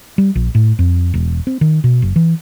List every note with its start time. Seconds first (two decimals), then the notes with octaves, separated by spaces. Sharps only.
0.18 G3
0.35 A#1
0.55 A2
0.79 F2
1.14 E1
1.47 C4
1.61 D#3
1.84 B2
2.02 F#1
2.16 E3